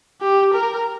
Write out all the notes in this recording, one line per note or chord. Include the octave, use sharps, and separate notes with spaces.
G4
A#4